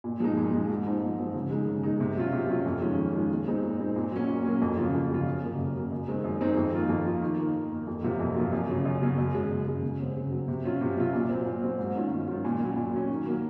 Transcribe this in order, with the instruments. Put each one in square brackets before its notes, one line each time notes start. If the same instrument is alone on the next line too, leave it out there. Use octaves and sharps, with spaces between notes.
[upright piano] A#2
F3 G#3 D#4
A#2
F3 G#3 D#4
G#2
F3 C4 D#4
G#2
F3 C4 D#4
C#3
G#3 D#4
C#3
G#3 D#4
C3
F#3 C#4 F4
C3
F#3 C#4 F4
F2
D#3 G#3 C#4 F4
F2
D#3 G#3 C#4 F4
A#2
G#3 C4 D#4
A#2
G#3 C4 D#4
A#2
F#3 A#3 C#4
A#2
F#3 A#3 C#4
F2
C#3 F#3 C#4 F4
F2
C#3 F#3 C#4 F4
F#2
C#3 F#3 A#3
F#2
C#3 F#3 A#3
F#2
D#3 G#3 C4 D#4
F#2
D#3 G#3 C4 D#4
F2
D#3 A#3 F4
F2
D#3 A#3 F4
D#3
A#3 D#4
D#3
A#3 D#4
F2
C3 F#3 A#3 F4
F2
C3 F#3 A#3 F4
F#2
C#3 F#3 C#4
F#2
C#3 F#3 C#4
F#2
C#3 G#3
F#2
C#3 G#3
C#3
F#3 C4
C#3
F#3 C4
C3
F#3 C#4 F4
C3
F#3 C#4 F4
A#2
F#3 C4
A#2
F#3 C4
G#2
D#3 F#3 C#4 F4
G#2
D#3 F#3 C#4 F4
A#2
F#3 C#4
A#2
F#3 C#4
D#3
F#3 A#3